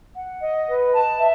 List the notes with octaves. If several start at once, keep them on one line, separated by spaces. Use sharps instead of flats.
F#5
D#5
B4
A5
E5